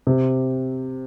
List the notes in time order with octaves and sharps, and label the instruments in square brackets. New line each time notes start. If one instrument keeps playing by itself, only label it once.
[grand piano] C3